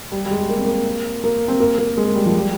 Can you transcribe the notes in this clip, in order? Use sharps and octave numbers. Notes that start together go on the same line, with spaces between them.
G3
G3
G#3
A#3
C4
A#3
A#3
C4
A#3
A#3
G#3
G3
F3
G3